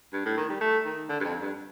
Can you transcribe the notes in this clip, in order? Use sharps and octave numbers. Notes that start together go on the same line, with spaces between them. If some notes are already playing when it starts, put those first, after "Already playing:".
G2
A2
D#3
G3
A3
D#3
D3
G2
F2
G2